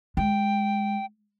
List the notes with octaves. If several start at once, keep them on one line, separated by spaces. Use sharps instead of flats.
G#3 G5